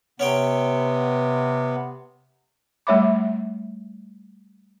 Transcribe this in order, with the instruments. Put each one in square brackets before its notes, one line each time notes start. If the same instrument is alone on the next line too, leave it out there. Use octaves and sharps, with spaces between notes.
[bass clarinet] C3 [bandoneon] B3 [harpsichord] C#4 C#5 G5
[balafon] G3 A3 C#5 E5 B5 D6